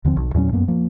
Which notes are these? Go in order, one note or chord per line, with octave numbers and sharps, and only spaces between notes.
D#2 D3 F3 C4
B1
E2 A#2 F#3 C#4
F#2 A#3 B3
F3 A#3